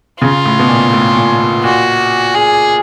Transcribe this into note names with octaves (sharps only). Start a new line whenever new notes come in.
C#3 F4
A2
B2
A#2
A2
A#2
A#2
A#2 F#4
G#4